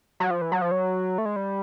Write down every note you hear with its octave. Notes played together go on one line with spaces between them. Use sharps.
F#3
F3
E3
F#3
F3
F#3
A3
G#3
G3